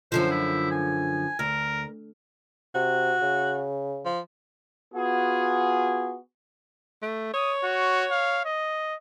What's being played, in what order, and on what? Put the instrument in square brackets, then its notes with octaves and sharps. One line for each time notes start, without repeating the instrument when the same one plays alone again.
[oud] F#2 D3 F3 [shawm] C5
[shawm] E4
G#5
[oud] D2 [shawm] A#4
[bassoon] C3 [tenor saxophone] F#4
[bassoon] C#3
[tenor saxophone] F3
[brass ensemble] B3 F4 F#4 G#4
[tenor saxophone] A3
[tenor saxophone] C#5 [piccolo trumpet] D#6
[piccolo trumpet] F#4
F5
D#5